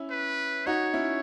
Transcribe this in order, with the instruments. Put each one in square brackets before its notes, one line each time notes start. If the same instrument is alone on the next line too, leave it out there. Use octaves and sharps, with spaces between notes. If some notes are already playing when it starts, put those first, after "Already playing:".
Already playing: [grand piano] C#4 E4
[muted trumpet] B4
[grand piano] D#4 F#4 [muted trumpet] C#5
[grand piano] C#4 E4